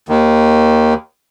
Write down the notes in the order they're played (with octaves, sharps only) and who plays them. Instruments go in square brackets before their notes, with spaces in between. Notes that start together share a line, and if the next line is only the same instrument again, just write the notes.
[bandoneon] D#2 D#3